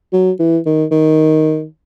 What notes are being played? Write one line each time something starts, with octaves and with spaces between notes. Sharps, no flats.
F#3
E3
D#3
D#3